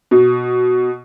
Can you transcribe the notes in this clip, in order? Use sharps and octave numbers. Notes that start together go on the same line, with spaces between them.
B2